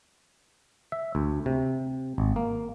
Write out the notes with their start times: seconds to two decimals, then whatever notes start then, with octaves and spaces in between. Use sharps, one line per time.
0.92 E5
1.15 D2
1.46 C3
2.18 G#1
2.36 A#3